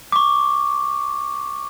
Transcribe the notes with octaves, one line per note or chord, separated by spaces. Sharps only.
C#6 D6